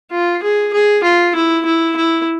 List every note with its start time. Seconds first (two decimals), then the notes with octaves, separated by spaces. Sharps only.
0.11 F4
0.43 G#4
0.73 G#4
1.04 F4
1.36 E4
1.66 E4
1.96 E4